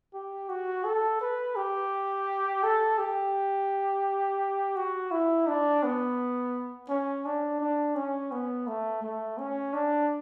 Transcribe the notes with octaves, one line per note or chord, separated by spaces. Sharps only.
G4
F#4
A4
B4
G4
A4
G4
F#4
E4
D4
B3
C#4
D4
D4
C#4
B3
A3
A3
C#4
D4